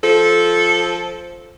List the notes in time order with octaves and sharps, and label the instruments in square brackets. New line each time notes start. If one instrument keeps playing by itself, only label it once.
[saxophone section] F3 A4